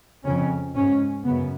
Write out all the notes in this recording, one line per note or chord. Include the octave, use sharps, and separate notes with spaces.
F2 C#3 C#4
G#2 C#4
F#2 C#3 B3